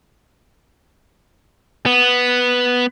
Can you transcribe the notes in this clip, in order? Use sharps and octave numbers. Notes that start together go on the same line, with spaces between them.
B3